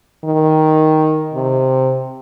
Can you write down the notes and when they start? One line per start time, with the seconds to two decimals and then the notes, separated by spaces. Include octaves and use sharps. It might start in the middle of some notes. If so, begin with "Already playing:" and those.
0.24 D#3
1.34 C3